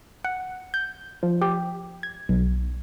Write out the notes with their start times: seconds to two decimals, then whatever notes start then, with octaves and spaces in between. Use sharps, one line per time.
0.24 F#5
0.74 G6
1.23 F3
1.42 G4
2.03 G#6
2.29 B1